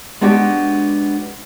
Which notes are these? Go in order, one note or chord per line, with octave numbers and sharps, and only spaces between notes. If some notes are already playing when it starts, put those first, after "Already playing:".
G#3 B3 D4 F#4 G4